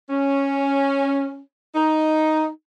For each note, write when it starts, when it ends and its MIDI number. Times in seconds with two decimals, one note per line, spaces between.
0.10 1.41 61
1.75 2.47 63